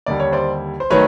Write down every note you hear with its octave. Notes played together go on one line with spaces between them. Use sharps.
D#2 D3 G3 D5
C#5
C5 D5
C5
D#3 F#3 A3 B4 C#5